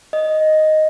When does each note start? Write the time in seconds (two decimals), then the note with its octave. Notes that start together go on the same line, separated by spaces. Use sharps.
0.13 D#5